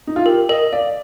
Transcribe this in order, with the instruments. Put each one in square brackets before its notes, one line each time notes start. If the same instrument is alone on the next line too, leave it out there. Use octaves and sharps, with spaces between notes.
[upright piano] D#4
F4
[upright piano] G4 [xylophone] A#4
[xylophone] A#4 [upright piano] D#5
[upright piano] D5 [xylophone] F5